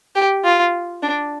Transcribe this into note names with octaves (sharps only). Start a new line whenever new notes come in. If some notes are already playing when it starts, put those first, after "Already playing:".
G4
F4
D4